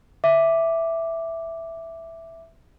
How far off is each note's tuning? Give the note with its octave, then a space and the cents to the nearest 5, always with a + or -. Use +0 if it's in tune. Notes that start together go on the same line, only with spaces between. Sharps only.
E5 +0 D6 +0